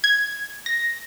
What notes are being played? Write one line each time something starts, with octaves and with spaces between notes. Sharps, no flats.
G#6
A#6